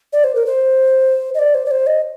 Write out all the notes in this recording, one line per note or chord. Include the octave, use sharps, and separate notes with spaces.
D5
C5
A#4
C5
D#5
D5
C5
D5
C5
D#5